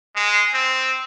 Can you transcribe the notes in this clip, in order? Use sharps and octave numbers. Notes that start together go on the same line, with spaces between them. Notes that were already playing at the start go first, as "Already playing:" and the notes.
G#3
C4